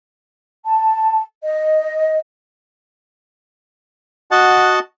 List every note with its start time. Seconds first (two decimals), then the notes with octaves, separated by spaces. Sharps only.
0.66 A5
1.44 D#5
4.31 F#4 D#5 F#5 A5